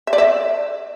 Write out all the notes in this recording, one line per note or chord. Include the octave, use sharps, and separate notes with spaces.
E5
D5
E5